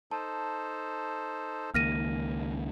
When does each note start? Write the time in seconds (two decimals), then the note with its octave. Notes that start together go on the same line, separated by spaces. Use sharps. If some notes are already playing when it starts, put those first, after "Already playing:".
0.11 D#4 A4 C5 A5
1.74 C#2 D#3 A#3 F6 A#6 D#7